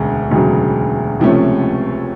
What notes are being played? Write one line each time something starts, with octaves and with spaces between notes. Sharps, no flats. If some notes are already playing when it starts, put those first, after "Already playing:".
Already playing: E1 D2 C#3
E1 D2 C#3 F#3
C#2 C3 F3 A3 C#4